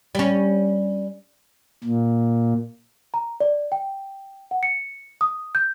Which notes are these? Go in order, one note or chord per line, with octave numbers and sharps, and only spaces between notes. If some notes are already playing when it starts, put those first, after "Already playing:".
G3 C#4
A#2
A#5
D5
G5
F#5
C#7
D#6
G6